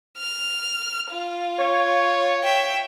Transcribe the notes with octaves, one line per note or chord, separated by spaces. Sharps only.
F6
F4
C#5
E5 G5